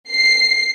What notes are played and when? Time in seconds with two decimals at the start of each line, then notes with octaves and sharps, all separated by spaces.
0.10 C7